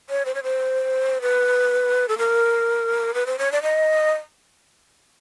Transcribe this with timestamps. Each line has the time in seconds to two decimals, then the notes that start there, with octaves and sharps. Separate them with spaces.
0.10 C#5
0.25 C5
0.35 C#5
0.43 C5
1.22 B4
2.08 A4
2.18 A#4
3.14 B4
3.26 C5
3.38 C#5
3.52 D5
3.62 D#5